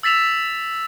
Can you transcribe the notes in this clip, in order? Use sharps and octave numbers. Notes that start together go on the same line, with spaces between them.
E6 A6 B6 E7 F7